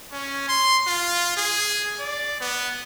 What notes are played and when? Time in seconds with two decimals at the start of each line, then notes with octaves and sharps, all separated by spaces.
0.12 C#4
0.48 C6
0.87 F4
1.37 G#4
1.99 D5
2.41 B3